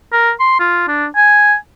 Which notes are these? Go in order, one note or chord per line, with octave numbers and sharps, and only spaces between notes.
A#4
C6
F4
D4
G#5